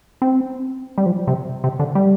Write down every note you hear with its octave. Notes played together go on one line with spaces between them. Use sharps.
C4
G3
F3
C3
C3
D3
G3